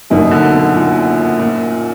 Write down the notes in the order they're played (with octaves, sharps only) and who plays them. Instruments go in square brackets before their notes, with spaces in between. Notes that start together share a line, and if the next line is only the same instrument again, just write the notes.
[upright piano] F#1 F#2 D#3 [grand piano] B2
[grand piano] D3
B2
A#2
A#2